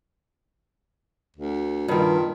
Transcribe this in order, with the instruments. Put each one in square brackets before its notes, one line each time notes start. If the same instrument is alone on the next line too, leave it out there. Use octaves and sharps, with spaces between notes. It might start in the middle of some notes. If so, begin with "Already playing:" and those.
[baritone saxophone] D2
[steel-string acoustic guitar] G2 D#3 [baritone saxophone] A#2